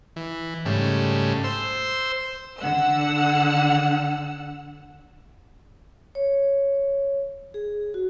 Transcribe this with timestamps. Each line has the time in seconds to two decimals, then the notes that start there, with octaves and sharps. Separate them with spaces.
0.16 E3
0.65 G#2 C#3 G3 A3
1.44 C5 E6
2.58 D3 F#5 E6
6.15 C#5
7.54 G#4
7.94 F#4